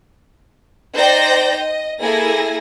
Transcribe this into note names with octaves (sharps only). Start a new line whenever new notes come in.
D#4 C5 D5 G5 G6 A#6
D#5
A#3 E4 G#4 A4 G#5 A#6